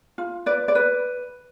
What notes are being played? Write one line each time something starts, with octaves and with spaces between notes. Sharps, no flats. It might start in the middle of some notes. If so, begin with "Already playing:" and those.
F4
B4 D5
D5
B4